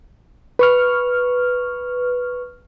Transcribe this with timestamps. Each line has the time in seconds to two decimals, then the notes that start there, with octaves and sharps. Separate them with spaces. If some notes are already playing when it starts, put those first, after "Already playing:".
0.59 B4 C#6 F6